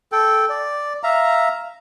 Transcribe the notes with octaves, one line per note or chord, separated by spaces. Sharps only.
A4 G5
D5
E5 F5 A#5